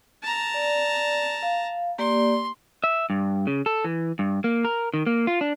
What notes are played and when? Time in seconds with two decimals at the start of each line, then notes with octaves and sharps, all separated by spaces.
0.23 A5 A#5
0.54 D5
1.43 F5
1.98 A#3 G4 D5 C6
2.84 E5
3.10 G2
3.47 C#3
3.66 A4
3.84 E3
4.19 G2
4.44 A#3
4.65 A#4
4.94 D#3
5.06 A#3
5.27 F4
5.41 D4